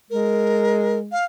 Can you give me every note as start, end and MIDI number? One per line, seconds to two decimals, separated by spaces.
0.10 1.14 56
0.10 0.99 70
1.12 1.25 77